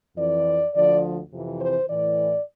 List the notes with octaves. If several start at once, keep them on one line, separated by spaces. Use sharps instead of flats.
F2 E3 D5
D2 D3 F3 D5
F2 C3 E3
C5
A2 E3 D5